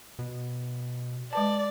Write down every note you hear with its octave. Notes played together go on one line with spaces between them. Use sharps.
B2
G#3 B4 D5 A5